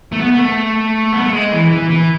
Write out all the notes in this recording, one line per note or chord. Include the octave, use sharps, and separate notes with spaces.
A3
B3
B3
A3
B3
A3
G#3
E3
E3
E3